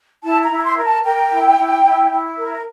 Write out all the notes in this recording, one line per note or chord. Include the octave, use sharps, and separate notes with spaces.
E4 A5
A#5
E4
A#5
C6
A#4
A5
A#4 G5
E4
E4
E4
E4
A#4